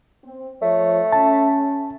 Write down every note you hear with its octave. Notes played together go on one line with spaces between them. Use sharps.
C4
F3 A3 C#5
C#4 A5